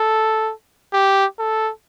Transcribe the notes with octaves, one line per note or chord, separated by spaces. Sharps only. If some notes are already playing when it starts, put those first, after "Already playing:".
Already playing: A4
G4
A4